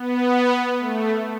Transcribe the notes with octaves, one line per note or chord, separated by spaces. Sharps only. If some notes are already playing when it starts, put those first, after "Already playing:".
Already playing: B3
A3